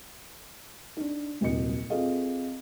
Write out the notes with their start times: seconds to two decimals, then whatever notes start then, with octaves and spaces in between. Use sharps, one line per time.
0.97 D4 D#4
1.41 D#1 C2 F#3 D#5 C#7
1.90 C4 F4 G#4 A4 D#5 F5